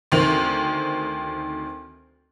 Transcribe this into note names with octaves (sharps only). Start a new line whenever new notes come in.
D2 D#3 C4 F7